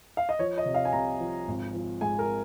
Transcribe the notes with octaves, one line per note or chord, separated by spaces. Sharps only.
F5
D#5
F3 C#5
D#5
C3
F5
G#5
C2 A#5
F3
G#1
F3
G#2 G#5
A#4